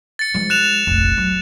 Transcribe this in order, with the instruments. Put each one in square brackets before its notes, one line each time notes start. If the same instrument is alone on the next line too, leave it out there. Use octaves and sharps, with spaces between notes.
[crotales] A6 C#7
[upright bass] F3 G#3
[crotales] F#6 E7 F7
[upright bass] F1 A#1
F#3